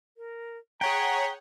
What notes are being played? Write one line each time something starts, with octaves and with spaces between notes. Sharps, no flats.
A#4
G#4 C#5 F#5 G5 A#5 B6